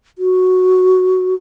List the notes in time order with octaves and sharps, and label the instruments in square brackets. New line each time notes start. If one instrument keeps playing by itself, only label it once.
[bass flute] F#4